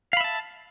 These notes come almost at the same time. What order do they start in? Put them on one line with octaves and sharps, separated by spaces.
F5 B5 E5 A5